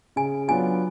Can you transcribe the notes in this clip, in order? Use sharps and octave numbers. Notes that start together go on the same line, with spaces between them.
C#3 G#5
F#3 B3 D4 F4 G#5